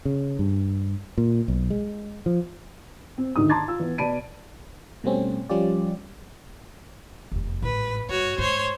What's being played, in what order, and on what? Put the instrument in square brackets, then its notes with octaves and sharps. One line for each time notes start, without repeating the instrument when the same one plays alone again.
[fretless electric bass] C#3
G2
A#2
B1
G#3
F3
[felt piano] C4
D2 G#2 D#3 D#4 D#6
A5 A#5 C6 D6 G#6 A6
F4 E6
E3 B3
B2 D5 A5 B5 D7 D#7
[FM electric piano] B2 G3 A3 C4 C#4
F3 G3 C#4 F4 G4 D5
[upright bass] F1 E2
[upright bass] A1 G#2 [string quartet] B4
[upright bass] G2 [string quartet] F#4 C#5
[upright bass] G#2 [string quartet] C5 C#5 C6